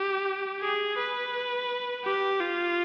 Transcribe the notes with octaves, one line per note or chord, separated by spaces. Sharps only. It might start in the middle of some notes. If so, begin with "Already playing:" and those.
Already playing: G4
G#4
B4
G4
F4